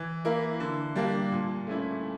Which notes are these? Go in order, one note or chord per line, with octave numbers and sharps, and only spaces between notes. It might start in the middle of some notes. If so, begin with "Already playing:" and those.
Already playing: E3
A#3 E4 A#4
D3
G3 A#3 D4
A#2
A3 C#4 E4